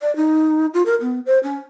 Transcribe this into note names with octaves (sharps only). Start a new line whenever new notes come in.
D5
D#4
F4
A#4
B3
C5
C#4